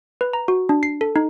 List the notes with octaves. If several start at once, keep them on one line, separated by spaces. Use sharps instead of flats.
B4
A#5
F#4
D4
C7
A4
D#4